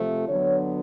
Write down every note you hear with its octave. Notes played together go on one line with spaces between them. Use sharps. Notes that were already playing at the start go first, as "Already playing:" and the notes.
Already playing: C3 F3 A3
D3 F#3 B3 C#5